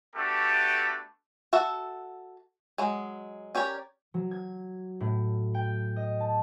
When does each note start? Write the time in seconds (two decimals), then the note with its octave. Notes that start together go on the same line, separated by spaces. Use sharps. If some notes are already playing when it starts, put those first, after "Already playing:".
0.15 A3 B3 D4 F#4 G4 A4
1.53 F#4 A4 E5 F#5
2.78 F#3 G#3
3.55 C#4 G4 A#4 C#5 D5
4.14 F#3
4.31 G#6
5.00 A2
5.54 G5
5.96 D#5
6.20 A5